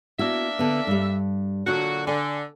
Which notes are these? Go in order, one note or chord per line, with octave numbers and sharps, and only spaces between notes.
A#3 B3 D4 E4 F#4 E5
D3 B3
G2 G3
A#2 D3 F#3 D4 F#4
D3 G#5